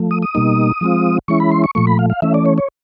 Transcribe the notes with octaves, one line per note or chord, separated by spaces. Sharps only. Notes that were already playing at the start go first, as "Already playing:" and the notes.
Already playing: F3 A3
D#6
D#6
B2 G3 A#3 D#4
F3 G#3 C4 F4
E3 G#3 C#4 E4 C#6
B5
C6
C#6
A#2 F3 A3 C#6
B5
F5
F5
E3 A3 C#4 E5
D5
C#5
C#5